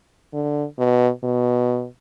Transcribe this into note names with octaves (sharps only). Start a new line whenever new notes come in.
D3
B2
B2